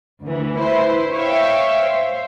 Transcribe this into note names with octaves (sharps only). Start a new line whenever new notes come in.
D2 E3
E4 B4 C5
C#5 E5 F5 G5
C5